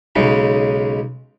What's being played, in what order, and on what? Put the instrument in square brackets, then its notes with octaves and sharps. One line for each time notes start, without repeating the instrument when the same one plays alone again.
[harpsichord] B1 C#3 G#3 D#4